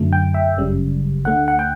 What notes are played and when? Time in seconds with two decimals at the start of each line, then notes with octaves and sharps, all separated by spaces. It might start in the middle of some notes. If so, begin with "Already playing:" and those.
Already playing: F#2 D3 F#3 A3
0.13 G5
0.34 E5
0.57 G1 F#2 C#3 G3
1.25 D2 D3 A3 F#5
1.48 F#5
1.59 G5